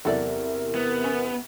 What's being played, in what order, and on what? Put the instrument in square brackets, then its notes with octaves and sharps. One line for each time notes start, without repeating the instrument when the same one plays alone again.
[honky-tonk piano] E2 C3 E4 [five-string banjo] F#3 A4 D5 [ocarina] A#4
[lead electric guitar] B3
[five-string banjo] C#4